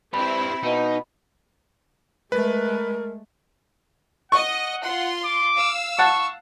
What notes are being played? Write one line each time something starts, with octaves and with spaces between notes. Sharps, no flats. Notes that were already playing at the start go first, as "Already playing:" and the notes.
C4 E4 G4 B4 B5
B2 D#4
G#3 A3 A#4 B4
D#5 F#5 C#6
F4 F#5 C6
D6
F5 E6
F#5 A5 C#6